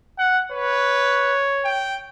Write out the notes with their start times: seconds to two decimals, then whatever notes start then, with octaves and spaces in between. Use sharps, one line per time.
0.19 F#5
0.52 B4 C#5
1.65 G5